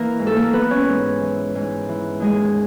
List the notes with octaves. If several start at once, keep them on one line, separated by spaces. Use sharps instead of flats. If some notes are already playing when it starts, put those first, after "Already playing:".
Already playing: E3 A#3 A#4
G#2
A4
A#3 A#4
E3 B3 B4
C#4 C#5
G#2
E3
G#2
E3
D#2 G#3 G#4